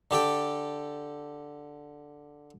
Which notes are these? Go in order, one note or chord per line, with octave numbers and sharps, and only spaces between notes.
D3 G4 A4 G5